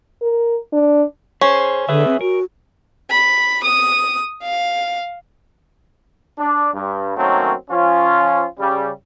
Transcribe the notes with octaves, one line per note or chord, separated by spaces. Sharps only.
A#4
D4
C#4 G#4 C5
D3 G#4 B4 E5
C4
F#4 A#4
B5
D#6
F5
D4
G2
D#3 F#3 A3 A#3 C4 C#4
F3 C#4 F4
C#3 G3